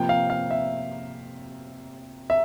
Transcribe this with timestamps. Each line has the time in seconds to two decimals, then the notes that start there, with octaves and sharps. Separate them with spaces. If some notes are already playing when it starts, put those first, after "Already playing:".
Already playing: C3 F3 A#3 G5
0.09 F5
0.30 F5
0.51 E5
2.30 E5